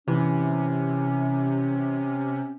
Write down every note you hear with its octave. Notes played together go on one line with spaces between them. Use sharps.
C3 E3 C#4